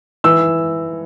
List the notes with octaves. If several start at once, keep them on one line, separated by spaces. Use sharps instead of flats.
E3 E6